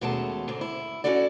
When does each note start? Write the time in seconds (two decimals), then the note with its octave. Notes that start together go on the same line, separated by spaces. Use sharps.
0.01 D#2 B2 G#3 A3 C#4 A5
0.48 G#2 D3 C4
0.61 E4
1.04 C#4 D4 E4 F#4 A4 D5